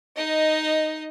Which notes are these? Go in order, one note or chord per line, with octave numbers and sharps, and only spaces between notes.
D#4 D#5